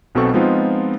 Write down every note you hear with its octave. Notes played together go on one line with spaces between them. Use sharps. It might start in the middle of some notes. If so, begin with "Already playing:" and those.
B1 B2 C4 A4 C#6
F3 G#3 B3 C4 D#4 F4